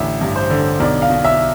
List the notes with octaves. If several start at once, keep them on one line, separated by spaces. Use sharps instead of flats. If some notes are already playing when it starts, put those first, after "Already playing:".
Already playing: A1 D3 E5
G2
C5
D3
B1 D5
F5
B2
E5